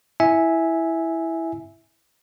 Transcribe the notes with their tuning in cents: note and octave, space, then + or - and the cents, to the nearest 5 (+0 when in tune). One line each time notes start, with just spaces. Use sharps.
E4 +0 E5 -10 G#5 +0